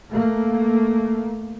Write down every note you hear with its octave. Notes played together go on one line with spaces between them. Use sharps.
A3 A#3